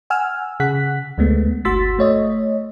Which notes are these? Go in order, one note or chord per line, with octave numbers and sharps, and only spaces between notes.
F#5 G#5 E6 F6
C#3 G#4 F#5 F#6 B6
D2 G#3 A3 B3
G1 F#4 C6 E6 A6 B6
A3 C#5 D#5